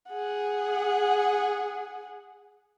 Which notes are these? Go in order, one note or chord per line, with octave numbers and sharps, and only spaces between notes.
G#4 F#5